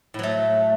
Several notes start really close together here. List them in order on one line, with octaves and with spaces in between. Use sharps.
A2 F#3 A3